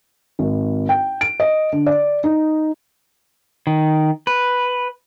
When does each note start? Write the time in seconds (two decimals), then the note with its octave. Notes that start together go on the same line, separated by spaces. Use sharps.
0.39 G#1
0.89 G5
1.21 D7
1.40 D#5
1.72 D3
1.86 D5
2.24 D#4
3.67 D#3
4.27 B4